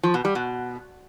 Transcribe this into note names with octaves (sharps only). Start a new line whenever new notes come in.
F3
B2
G3
B2